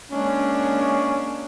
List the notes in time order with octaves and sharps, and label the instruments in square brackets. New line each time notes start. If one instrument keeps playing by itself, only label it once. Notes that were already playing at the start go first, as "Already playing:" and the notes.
[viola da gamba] G#3 A#3 D4 [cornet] C#4